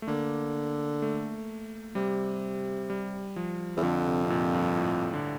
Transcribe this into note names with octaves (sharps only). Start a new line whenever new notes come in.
A3
D3 A#3
A3
C3 G3
G3
F3
E2
F2 D3
C3
C3
A#2
G2
A2
D3